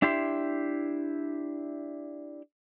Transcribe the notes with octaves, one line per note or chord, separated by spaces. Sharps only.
D4 E4 G4 E5 C6